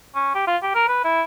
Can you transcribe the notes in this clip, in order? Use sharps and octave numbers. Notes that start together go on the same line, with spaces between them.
C#4
G4
F4
G4
A#4
B4
E4